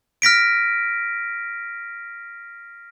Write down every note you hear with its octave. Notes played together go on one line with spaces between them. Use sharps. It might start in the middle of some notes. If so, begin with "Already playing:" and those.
F6 A#6 B6 D7